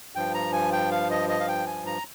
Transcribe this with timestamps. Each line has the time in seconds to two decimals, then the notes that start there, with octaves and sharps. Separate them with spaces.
0.15 G2 F3 G5
0.34 A#5
0.53 G#5
0.73 G5
0.91 F5
1.11 D#5
1.29 D#5
1.40 F5
1.48 G5
1.67 G#5
1.86 A#5